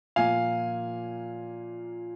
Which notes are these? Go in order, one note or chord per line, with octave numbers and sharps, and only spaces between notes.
A#2 F3 A#3 F5 G#5